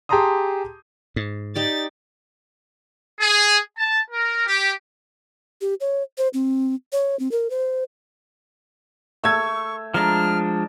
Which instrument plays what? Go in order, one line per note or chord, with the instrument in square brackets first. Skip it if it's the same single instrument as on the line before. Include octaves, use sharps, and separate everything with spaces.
[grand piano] G4 G#4 A5 A#5 C6 D#6
[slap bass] G#2
[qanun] D#4 G4 D5 [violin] A6
[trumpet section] G#4
A5
A#4
G4
[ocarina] G4
C#5
C5
C4
C#5
C4
A#4
C5
[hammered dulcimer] A3 [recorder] C#6 [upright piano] E6 G#6
[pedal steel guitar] F3 G#3 D4 [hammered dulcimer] A#5 [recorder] F6